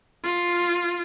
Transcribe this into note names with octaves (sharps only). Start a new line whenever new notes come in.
F4